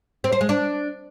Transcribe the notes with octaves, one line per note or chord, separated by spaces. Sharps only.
C4
C5
G#3
D4